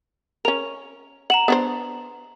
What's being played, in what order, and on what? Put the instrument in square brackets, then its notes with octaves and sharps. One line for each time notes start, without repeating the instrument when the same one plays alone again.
[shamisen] C#4 A#4 [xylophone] F7
[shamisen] F#5 [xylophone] A#5 E7 F#7
[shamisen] B3 D4 C5